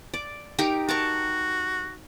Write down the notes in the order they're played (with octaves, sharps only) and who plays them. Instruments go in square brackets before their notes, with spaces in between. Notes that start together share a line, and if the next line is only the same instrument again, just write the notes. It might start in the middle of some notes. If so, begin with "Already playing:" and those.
[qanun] D5
D#4 G4 A#4
[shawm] F#4 [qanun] A#4 A5 C#6